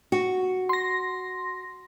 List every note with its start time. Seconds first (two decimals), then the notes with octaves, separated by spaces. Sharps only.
0.12 F#4
0.69 C6 A#6